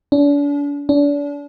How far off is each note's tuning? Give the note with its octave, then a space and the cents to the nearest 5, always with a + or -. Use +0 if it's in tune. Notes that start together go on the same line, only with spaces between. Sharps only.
D4 -40
D4 -35